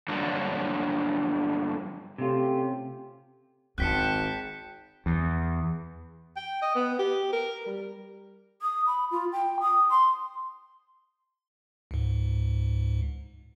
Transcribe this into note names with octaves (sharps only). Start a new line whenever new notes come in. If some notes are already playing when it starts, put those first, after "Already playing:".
G2 D3 F3 F#3 A#3 D4
C3 A3 C#4 F4 G4
G#1 C4 F4 G5 A5 F#6 B6 C#7
E2
G5
D#5
B3
G4
A#4
G3
D#6
B5
F4
G5
D#6
C6
C#2 G#2